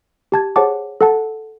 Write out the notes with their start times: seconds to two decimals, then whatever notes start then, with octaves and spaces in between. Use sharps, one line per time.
0.32 G4 A5 G#6
0.56 G#4 C5 C#5 F#5 A5 D6
1.01 A4 F#5 A5